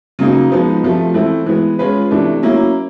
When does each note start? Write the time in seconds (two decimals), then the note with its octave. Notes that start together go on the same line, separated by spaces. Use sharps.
0.19 C#3 F#3 A#3 D#4
0.50 F3 G#3 B3 D#4
0.83 C3 F3 A3
1.14 E3 A3 C4 E4
1.46 E3 G#3 B3
1.79 G#3 C#4 F4 G#4 B4
2.11 C3 E3 A3 D4
2.43 F#3 A#3 C#4 E4